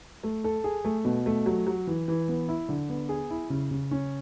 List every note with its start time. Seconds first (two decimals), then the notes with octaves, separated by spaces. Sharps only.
0.23 A3
0.44 A4
0.64 G#4
0.85 A3
1.05 B2
1.26 A3
1.46 F#3
1.67 F#3
1.87 E3
2.08 E3
2.28 B3
2.48 E4
2.69 D3
2.89 B3
3.09 G#4
3.30 E4
3.50 C#3
3.71 C#3
3.91 C#4